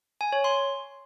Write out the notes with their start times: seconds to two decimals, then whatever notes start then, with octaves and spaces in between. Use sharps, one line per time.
0.21 G#5
0.32 C#5
0.44 C6